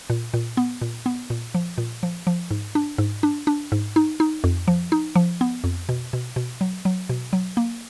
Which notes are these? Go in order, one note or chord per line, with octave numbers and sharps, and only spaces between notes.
A#2
A#2
B3
A#2
B3
A#2
F3
A#2
F3
F3
G#2
D4
G#2
D4
D4
G#2
D#4
D#4
F2
F3
D#4
F3
B3
F2
B2
B2
B2
F#3
F#3
B2
F#3
A#3